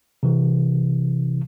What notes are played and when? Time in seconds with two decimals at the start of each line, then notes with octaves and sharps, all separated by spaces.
0.23 C3 E3